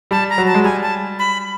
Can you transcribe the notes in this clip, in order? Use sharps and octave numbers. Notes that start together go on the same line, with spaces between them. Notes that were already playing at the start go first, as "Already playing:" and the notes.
G3 A5
A#5
F#3
A5
G#3
G3 G#5
A5
B5